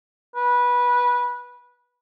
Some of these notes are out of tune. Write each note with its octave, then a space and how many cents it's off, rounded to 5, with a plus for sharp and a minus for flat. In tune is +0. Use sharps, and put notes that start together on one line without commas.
B4 -15